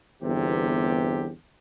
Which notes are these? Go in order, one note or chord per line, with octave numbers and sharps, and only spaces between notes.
G1 E2 C3 G4